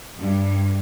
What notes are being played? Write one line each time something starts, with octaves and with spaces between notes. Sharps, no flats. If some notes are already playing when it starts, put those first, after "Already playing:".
G2